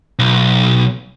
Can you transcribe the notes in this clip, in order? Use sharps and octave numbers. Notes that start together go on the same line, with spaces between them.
B1